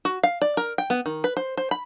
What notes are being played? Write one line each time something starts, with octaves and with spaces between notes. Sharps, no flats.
F#4
F5
D5
A#4
G5
B3
D#3
B4
C5
C5
B5